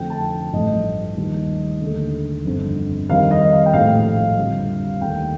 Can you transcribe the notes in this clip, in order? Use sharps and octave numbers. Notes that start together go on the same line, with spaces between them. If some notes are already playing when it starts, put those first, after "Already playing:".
Already playing: F2 D3 F3 A3 G5
A5
G5
A1 G2 F3 A3 D#5
D#2 D#3 G3
D#2 D3 A3
G1 F2 D3
F2 D#3 G3 F5
D#5
F5
G5
A#1 A2 F3 A3 F5
F2 D3 G3
D#2 D#3 A3 G5